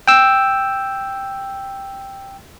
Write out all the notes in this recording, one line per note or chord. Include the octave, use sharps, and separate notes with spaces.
G5 E6